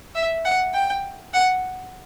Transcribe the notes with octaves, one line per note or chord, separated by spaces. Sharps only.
E5
F#5
G5
F#5